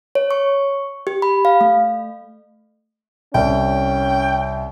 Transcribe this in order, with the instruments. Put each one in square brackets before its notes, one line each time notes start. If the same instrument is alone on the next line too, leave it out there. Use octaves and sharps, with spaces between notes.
[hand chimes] C#5
C#6
G4
B5
F5
A3
[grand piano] C2 [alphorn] C#4 [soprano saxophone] G5